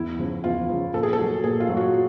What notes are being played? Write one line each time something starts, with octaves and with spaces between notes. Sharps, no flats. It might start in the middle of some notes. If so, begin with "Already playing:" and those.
Already playing: E2 E4
C#3 F3
E2 F4
C#3 F3
A#2 A4
G#4
A4
F#3
A#2 G#4
F4
F#3
F#4